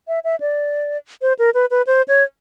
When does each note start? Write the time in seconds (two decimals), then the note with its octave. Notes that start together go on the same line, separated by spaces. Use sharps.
0.08 E5
0.24 E5
0.40 D5
1.22 C5
1.39 A#4
1.54 B4
1.71 B4
1.87 C5
2.08 C#5